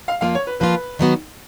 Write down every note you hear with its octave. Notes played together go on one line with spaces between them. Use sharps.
F5
F2 F3 A#3 F4 F5
C#5
B4
F2 F3 A#3 F4 B4
D#3 F#3 B3 F#4